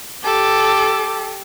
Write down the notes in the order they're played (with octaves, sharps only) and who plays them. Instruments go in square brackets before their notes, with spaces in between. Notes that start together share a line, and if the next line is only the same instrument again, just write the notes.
[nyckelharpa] G4 [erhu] A4